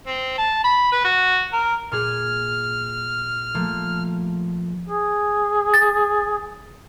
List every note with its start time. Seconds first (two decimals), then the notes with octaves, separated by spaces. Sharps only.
0.06 C4
0.38 A5
0.64 B5
0.92 B4
1.05 F#4
1.53 A#4
1.92 A#2 G#4 F6
3.54 F3 A3 A#3
4.88 G#4
5.74 A6